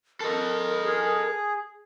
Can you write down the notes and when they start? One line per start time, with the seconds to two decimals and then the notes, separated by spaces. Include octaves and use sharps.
0.20 A4 A#4 D#5
0.85 G#4